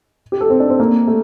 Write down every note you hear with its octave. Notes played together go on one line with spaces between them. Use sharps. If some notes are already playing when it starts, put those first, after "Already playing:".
G4
A4
C4
D4
C4
A#3
A3